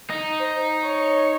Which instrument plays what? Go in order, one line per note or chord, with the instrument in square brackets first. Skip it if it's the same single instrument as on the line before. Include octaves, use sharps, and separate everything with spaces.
[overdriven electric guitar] D#4
[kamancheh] C5
C#5